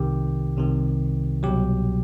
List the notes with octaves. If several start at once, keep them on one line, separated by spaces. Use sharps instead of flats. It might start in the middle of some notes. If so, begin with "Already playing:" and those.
Already playing: C2 C3 D#3 G4
C2 C3 D#3
C2 B2 F#3 G4